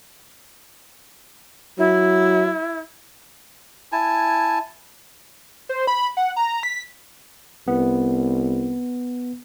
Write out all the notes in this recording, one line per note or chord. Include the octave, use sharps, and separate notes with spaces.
F#3 E4
E4 G#5 A5
C5
B5
F#5
A#5
B6
C2 B3